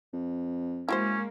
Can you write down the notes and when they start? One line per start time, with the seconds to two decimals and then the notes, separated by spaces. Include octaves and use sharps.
0.13 F2
0.89 G#3 A#3 C#4 E4 F#4 C5